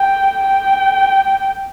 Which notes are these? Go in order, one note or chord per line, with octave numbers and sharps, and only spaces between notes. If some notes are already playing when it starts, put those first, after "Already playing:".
Already playing: G5
G5